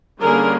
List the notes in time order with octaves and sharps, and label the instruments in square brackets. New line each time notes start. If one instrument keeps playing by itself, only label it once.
[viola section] D3 G3 A#3 C#4 G#4 A#4